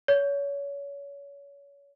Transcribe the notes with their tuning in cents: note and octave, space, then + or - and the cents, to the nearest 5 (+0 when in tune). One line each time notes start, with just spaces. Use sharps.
C#5 +30